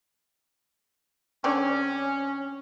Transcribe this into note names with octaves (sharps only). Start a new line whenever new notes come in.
D3 C4 C#4 D5